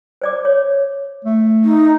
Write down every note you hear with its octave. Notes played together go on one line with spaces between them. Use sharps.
C5 D5 D6
C#5
A3
D#4